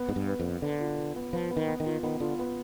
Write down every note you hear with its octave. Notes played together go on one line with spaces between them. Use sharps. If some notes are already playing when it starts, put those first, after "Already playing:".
Already playing: B3
G#2 B4
G2
B4
F2
B3
D3 B4
F4
F4
B3
F3 B4
B3
D#3
B3
D#3
F4
D#3 B3
D3 F4
B3